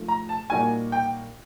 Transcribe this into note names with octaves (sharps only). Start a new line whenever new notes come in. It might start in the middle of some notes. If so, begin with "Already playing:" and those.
Already playing: G#2 F3 A3
A#5
A5
A#2 G3 A#3 D#4 F#4 G#5
G5